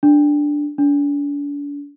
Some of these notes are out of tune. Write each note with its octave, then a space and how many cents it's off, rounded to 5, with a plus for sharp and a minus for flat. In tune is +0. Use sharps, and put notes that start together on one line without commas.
D4 +0
D4 -40